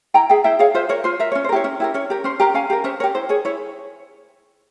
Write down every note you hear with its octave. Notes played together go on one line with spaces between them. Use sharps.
E4 G5 A#5
G#4 E5 G5
E4 E5 G5
G#4 C#5 F5
F4 C5 E5
A#4 C#5
F4 C5
A#4 E5
C#4 C#5
C5
A#4
E4 G4 C#5
C#4
E4 G4 A#4
C#4 C#5
G4 A#4
C#4 C5
G4 A#4 G5 A#5
C#4 F5 G#5
G4 A#4
C#4 C5 E5
G4 A#4 C#5
E4 C5
G#4 C#5
E4 C#5